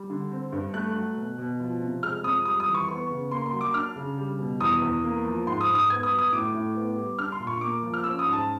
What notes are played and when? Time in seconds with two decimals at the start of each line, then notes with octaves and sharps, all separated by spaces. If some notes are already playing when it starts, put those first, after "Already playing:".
Already playing: G3
0.10 D3
0.31 C4
0.52 G2
0.74 A3 F#6
0.95 F#3
1.17 B2
1.38 B2
1.60 F3
1.82 C3
2.03 G#3 F6
2.24 F2 D#6
2.45 G3 D#6
2.60 D#6
2.67 E3
2.74 C#6
2.88 B3 C#6
3.10 C#3
3.31 A#3 C6
3.46 C6
3.53 F#3
3.61 D6
3.74 D4 F6
3.96 C#3
4.18 G3
4.39 B2
4.60 E2 D#6
4.82 E2
5.04 A#3
5.25 F3
5.47 G#2 C6
5.61 D#6
5.69 G#2
5.75 D#6
5.90 B3 G#6
6.03 D#6
6.11 F#3
6.18 D#6
6.32 A2 D6
6.54 A2
6.75 B3
6.97 G3
7.18 D4 F6
7.32 C6
7.40 A#2
7.47 C#6
7.61 A#3 D6
7.82 F3
7.94 F6
8.04 C#4 E6
8.19 D#6
8.26 G#2
8.33 A5